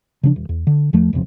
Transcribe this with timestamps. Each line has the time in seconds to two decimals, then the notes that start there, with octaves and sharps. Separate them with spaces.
0.23 C#3 F3 C4 D4
0.36 D#1
0.49 E2
0.67 D3
0.93 E2 F3 A3
1.13 E1 B1 F2 C3